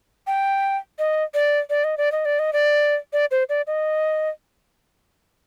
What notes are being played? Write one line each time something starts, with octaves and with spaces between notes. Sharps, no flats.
G5
D#5
D5
D5
D#5
D5
D#5
D5
D#5
D5
D5
C5
D5
D#5